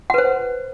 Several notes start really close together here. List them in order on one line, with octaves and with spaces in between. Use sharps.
F#5 B4 C5